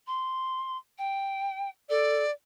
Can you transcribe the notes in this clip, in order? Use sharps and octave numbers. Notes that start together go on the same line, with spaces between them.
C6
G5
A4 D5